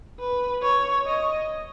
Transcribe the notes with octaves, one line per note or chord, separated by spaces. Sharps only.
B4
C#5
D#5